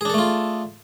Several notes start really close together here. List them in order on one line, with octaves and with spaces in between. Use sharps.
G#4 D4 A4 A3 F4